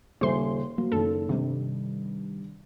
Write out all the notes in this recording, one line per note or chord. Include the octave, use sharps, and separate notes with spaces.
D#1 C#3 C5 E5 G#5 C6
F#3 A#3
F#1 D#3 A4
G2 C3 D#3 G3